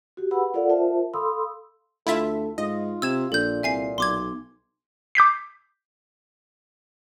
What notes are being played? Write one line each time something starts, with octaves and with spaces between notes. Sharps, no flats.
F#4 G4
G#4 B4 F#5 B5 E6
F4 A4 A#4 D5 F5 F#5
F4 A#4 C5 E5 A5
A4 F5 B5 C6 D#6 E6
D2 E4 F4 A4 E5
G#2 F4 D#5
C3 E6 G#6 E7
A#1 A#2 A4 G6
C2 E5 G#5 C7
B1 C6 D6 G#6
D6 G6 B6 C7